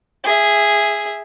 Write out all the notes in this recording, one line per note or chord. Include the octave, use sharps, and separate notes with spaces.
G#4 E5